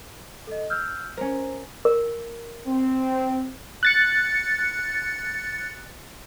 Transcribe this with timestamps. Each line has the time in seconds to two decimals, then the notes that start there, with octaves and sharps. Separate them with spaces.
0.47 A4 D#5
0.70 E6 F6 G6
1.17 C#4 A#4 C5
1.85 A#4
2.67 C4
3.83 F#6 A6 C#7